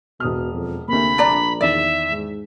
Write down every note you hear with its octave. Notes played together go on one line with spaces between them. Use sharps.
E1 B2 D#6 F6
F2
D2 C3 A#3 B5
A#1 D4 D5 A#5
E2 D#3 D5 E5
G#2